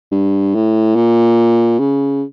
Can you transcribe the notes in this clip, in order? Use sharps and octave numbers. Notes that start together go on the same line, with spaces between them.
G2
A2
A#2
C#3